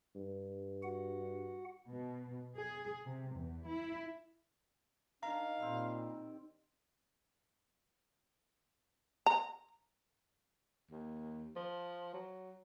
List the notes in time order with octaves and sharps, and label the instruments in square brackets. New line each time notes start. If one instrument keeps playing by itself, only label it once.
[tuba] G2
[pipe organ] F#4 F#5
[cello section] B2
G#4
C3
E2
E4
[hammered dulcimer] D#3 A#4 [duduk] D4 [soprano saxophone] F5 [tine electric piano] A#5
[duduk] A#2 [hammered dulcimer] G3 C4
[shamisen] A#5
[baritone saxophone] D#2
F3
F#3